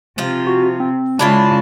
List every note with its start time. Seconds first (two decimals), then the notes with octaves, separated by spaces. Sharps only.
0.18 C3 F3 F4
0.47 F#4
0.80 C4
1.19 C#3 G#3 D4 E4 F4 A5